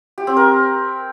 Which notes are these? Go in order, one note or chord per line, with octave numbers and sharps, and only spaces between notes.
G4
C4
A#4